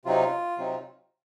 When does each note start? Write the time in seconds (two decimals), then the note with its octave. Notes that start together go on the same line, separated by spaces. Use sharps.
0.05 C3 F#3 C4 D#4 F4
0.58 C3 F#3 C4 D#4